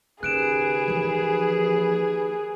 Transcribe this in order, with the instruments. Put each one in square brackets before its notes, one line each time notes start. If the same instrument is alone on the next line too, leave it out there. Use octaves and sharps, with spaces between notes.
[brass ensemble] D#2 B4 [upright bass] C#3 [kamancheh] G#4 [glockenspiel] F#6 D7 E7
[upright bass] E3 F3